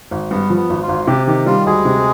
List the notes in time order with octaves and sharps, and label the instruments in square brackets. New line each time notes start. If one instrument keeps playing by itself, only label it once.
[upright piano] G#1
[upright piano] G2 [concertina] B3
[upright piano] F3
[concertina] B3
[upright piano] G#1
[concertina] F4
[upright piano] G#1
[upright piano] C3 [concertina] G4
[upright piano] D#3 [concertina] G4
[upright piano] G3 [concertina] F4
[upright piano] D2 [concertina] G#3 G#4
[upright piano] C3